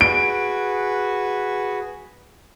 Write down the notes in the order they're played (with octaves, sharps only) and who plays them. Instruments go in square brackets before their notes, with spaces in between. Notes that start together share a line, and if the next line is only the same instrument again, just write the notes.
[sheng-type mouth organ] F#4 G#4 B4 [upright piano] D7